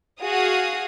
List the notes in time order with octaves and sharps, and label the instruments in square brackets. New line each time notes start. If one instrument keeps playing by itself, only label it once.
[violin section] F#4 G#4 F5 D#6